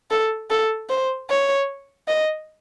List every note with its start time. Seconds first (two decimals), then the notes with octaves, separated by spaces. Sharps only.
0.11 A4
0.50 A4
0.90 C5
1.30 C#5
2.08 D#5